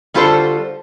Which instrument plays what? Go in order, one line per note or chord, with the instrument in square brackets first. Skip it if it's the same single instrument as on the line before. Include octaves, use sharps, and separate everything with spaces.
[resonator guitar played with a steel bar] D3 G3 F4 F#4 A4 C5